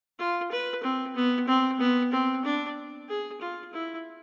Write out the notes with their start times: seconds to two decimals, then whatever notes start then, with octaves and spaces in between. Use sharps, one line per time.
0.19 F4
0.51 B4
0.83 C4
1.15 B3
1.47 C4
1.79 B3
2.12 C4
2.44 D4
3.08 G#4
3.41 F4
3.73 E4